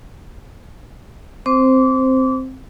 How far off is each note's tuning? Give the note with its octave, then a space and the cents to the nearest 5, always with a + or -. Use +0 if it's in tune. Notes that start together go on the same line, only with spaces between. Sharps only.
C4 +0 C5 +0 D6 -30